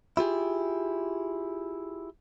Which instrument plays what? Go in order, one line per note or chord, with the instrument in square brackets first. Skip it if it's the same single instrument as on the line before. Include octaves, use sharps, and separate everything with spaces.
[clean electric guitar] E4 F4 G4 G#4